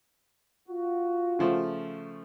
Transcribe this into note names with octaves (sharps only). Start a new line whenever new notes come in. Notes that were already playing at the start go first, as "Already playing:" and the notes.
F4 F#4
C#3 F3 A3